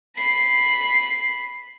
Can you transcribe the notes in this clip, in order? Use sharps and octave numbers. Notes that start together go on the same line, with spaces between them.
B5 C7